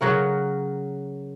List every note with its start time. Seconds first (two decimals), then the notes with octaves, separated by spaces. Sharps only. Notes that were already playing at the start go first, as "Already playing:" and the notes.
0.01 C#3 F#3 F#4 A#4